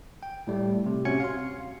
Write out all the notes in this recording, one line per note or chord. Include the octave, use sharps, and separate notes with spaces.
G5
A2 G3 A3
C3
C3 C#4 F#4 G#6 C#7
F5 C6